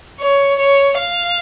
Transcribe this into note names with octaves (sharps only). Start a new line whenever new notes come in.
C#5
C#5
F5